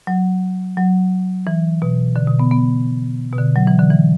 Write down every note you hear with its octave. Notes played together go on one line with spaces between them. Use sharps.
F#3
F#3
E3
B2
D3
B2
B3
B3
B2
D3
F#3
E3
D3
E3